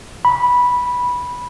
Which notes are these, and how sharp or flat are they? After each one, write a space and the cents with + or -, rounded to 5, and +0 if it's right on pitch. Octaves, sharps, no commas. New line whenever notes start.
B5 -10